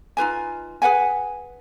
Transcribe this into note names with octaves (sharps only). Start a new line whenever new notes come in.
D#4 F4 B4 G#5
G#4 B4 F#5 G#5